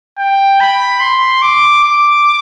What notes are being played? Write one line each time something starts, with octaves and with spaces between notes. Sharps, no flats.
G5
B5
C6
D6
D6